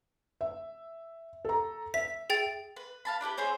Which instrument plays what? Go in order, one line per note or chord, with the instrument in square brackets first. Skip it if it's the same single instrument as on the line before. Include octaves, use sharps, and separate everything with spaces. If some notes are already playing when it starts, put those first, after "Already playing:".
[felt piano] E5
A4 A#5
[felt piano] E5 [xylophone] B6
[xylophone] G#4 G5 A6
[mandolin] B4
F5 A5 B5
D4 E4 G4 B4
C4 G#4 C5 C#5